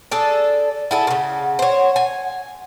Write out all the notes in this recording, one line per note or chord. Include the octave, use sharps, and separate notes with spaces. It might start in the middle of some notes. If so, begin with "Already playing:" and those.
D4 G#4 A4
E4 G#4 A4 F#5
A#2 C#3
C5 C#5
G#5